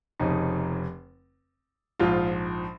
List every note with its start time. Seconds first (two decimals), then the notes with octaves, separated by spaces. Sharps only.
0.20 F1 F2 C#3 D#4
1.99 A#1 G#2 F3 F4